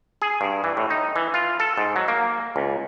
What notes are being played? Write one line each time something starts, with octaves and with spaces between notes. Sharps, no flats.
G#4
G2
E3
A2
D#4
E3
F4
A4
G#2
F#3
A#3
C#2